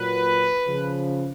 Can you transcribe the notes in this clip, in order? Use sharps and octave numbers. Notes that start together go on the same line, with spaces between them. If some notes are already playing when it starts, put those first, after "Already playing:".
Already playing: A#2 F#3 B4
C#3 F3